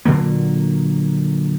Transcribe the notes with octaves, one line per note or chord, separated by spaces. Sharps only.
A#2 D3 F#3 A#3